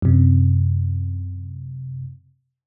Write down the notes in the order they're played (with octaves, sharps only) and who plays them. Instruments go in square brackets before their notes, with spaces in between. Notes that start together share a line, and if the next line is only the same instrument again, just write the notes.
[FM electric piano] F#2 C3